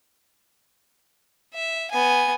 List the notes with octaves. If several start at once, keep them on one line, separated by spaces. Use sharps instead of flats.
E5
B3 G#5